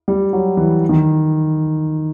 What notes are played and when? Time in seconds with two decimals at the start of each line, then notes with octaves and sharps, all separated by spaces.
0.08 G3
0.33 F#3
0.57 E3
0.89 D#3